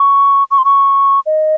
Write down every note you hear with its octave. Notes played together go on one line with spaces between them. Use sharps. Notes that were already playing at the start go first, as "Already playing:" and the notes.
Already playing: C#6
C#6
C6
C#6
D#5